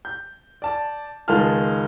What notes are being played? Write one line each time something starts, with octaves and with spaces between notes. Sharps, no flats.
G6
D5 A5
C#2 D#3 G#3 F4 A5 F6